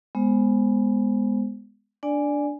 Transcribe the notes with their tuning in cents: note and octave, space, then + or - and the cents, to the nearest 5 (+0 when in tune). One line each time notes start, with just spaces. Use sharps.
G#3 +0 B3 +5 C5 +15
D4 -10 D5 +0 G#5 +0